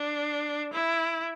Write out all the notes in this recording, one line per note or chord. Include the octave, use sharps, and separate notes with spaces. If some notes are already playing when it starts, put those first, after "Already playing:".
Already playing: D4
E4